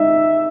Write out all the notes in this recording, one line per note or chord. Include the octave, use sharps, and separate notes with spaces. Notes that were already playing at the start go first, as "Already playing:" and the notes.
Already playing: G#3 D#4 E5